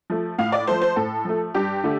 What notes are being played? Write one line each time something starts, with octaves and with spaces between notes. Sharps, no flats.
F3 A3
A2 F5
D5
F3 A3 C5
C5
A2 A4
F3 A3
G2 G4
D3 A3